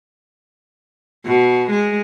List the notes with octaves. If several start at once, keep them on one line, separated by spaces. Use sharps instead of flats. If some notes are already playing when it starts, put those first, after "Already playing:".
B2
G#3